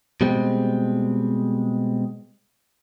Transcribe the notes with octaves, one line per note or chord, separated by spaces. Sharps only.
B2 G3 G#3 C4